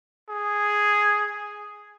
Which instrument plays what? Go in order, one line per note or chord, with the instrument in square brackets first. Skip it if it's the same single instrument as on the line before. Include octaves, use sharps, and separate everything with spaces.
[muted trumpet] G#4